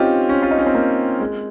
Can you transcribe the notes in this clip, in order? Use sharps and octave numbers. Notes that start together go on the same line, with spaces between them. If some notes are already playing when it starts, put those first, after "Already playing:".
Already playing: C4 C#4 D#4 F4 G4
C#4
F4
D#4
C#4
C4
A#3
G#3